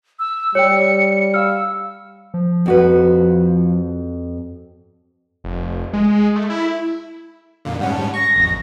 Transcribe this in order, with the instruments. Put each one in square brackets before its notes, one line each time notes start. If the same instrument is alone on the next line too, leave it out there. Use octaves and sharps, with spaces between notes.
[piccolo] E6
[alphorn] G3 [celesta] C#5 G5 [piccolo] C#7
[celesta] F5 F6 [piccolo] E6
[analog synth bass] F3
[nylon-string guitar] F2 F#4 B4
[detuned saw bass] F1
G#3
A3
E4
[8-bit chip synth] F2 A#2 D3 [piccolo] F5
[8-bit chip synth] G#2 G3 C#4 [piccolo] F#5
[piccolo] A5
[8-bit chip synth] C#6 [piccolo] A#6
[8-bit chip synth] A1 F2